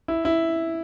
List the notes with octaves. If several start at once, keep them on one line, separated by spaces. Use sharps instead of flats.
E4
E4